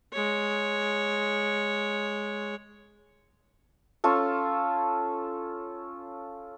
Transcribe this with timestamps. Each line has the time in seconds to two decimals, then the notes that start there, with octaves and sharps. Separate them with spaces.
0.13 G#3 C#5
4.04 C#4 F4 A4